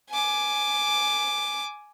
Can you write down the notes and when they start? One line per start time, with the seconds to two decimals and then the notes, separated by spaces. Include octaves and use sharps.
0.11 G#5 D6